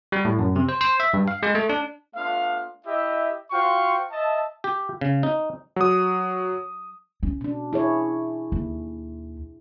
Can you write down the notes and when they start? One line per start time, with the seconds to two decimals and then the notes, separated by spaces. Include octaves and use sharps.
0.12 G3
0.25 A2
0.39 F#2
0.56 C3
0.69 C5
0.81 C5
1.00 E5
1.14 G2
1.28 F5
1.43 G#3
1.55 A3
1.69 D4
2.15 A3 B3 D4 F4 F5
2.86 E4 G4 D#5 E5
3.51 F4 F#4 C5 F5 G5 C#6
4.11 D#5 E5 A5
4.64 G4
5.01 C#3
5.23 D#4
5.76 F#3 D#6
7.23 C#4
7.41 B2 D4
7.73 E4 G#4 C#5
8.52 D#2